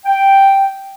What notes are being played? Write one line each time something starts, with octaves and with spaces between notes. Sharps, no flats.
G5